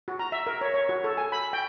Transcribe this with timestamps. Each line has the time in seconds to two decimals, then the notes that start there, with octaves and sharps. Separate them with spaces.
0.08 F#4
0.19 A#5
0.32 E5
0.47 A#4
0.61 C#5
0.74 C#5
0.89 F#4
1.04 A4
1.17 G#5
1.32 B5
1.53 G5